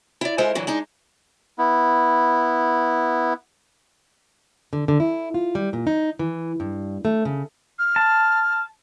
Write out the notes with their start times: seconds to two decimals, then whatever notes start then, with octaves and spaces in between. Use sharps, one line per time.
0.21 E4 D5
0.38 G#3 E4 A4 A#4 C5
0.55 A#2 D3 E3 F#3
0.67 G#3 D4 D#4
1.58 B3 E4
4.73 D3
4.88 D3
5.00 E4
5.34 F4
5.55 G3
5.73 A#2
5.87 D#4
6.19 E3
6.60 G2
7.05 A3
7.25 C#3
7.79 F6
7.96 A5